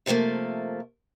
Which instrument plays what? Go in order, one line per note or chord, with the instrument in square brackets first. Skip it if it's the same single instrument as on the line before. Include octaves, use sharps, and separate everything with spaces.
[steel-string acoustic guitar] C3 F3 G3 A3 A#3